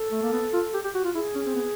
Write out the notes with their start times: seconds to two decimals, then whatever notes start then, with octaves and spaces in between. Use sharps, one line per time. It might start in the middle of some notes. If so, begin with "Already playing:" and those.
Already playing: A4
0.11 A3
0.22 A#3
0.32 B3
0.53 F4
0.74 G4
0.84 G4
0.94 F#4
1.04 F4
1.15 E4 G#4
1.35 C#4
1.46 C4
1.56 B3